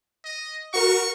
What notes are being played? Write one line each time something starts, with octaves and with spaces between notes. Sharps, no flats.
D#5
F#4 A#4 C#6